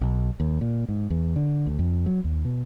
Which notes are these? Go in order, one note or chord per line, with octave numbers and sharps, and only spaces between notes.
B1
D#2
A#2
G#2
E2
D3
D2
F2
F#3
D#2
B2